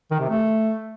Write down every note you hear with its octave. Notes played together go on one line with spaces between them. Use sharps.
D#3
C3
A3